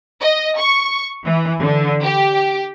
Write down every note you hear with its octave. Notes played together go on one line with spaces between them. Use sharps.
D#5
C#6
E3
D3
G4